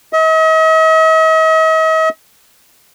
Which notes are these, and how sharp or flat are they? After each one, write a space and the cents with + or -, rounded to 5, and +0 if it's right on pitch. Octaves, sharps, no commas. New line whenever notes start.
D#5 +45